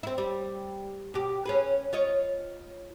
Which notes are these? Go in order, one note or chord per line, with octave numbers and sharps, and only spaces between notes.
C4 E4
G3
B2 G4
C#4 G#4 B4
F4 C#5 D#5